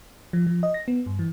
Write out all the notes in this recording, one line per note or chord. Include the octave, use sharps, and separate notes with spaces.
F3
F3
D#5
A#6
B3
G2
E3